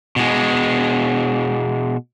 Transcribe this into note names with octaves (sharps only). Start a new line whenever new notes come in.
B2 G#3